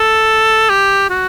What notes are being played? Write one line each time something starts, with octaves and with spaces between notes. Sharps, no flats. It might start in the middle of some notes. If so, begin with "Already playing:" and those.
Already playing: A4
G4
F#4